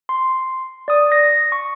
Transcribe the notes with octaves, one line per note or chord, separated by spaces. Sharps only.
C6
D5 D#6
A#6
C#6